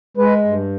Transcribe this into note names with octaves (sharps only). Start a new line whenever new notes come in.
G#3 B4
G2